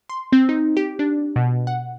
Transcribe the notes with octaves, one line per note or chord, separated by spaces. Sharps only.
C6
C4
D#4
G4
D4
B2
F#5